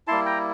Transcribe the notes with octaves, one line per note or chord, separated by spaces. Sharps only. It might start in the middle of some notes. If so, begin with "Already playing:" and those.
G3 A#3 E4 A5 C6
G5 A#5